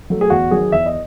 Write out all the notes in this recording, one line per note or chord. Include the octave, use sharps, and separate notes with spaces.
F#3 A3
G#4
E2 F#4
D#3 F#3 G#4
E2 E5
D#5